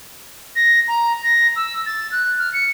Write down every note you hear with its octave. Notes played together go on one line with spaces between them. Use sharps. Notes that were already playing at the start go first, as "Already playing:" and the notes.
A#6
A#5
A#6
E6
A6
F#6
F6
C#7